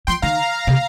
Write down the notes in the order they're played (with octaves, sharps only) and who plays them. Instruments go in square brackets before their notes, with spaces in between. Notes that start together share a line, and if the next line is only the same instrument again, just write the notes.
[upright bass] F3 [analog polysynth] G5 C6
[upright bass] D#3 [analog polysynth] F5 A#5
[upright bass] C3